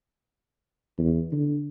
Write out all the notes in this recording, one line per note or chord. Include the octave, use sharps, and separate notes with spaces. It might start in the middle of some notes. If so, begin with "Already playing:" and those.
E2
D3